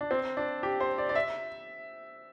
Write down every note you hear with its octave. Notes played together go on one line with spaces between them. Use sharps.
D4
C4
D4
G4
C5
D5
D5
E5